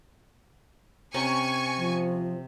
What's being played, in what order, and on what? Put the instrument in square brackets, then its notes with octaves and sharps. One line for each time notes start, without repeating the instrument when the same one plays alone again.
[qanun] C3 C#4 A#5 [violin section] G#5 C#6
[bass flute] F3